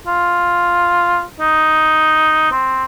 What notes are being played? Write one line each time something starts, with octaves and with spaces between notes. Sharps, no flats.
F4
D#4
C4